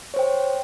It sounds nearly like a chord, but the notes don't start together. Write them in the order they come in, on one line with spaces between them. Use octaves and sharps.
C#5 C5 G5